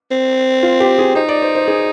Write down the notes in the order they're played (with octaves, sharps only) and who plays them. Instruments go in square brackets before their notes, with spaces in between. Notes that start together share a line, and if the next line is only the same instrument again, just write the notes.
[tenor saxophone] C4
[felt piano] F4
G4
G#4
[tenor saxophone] D#4 [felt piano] C5
[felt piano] D5
C5
C5
G#4